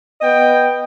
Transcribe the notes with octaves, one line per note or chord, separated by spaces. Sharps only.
B3 D#5 G5